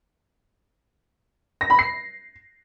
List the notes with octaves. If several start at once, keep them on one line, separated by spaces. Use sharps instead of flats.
A#6
B5
C7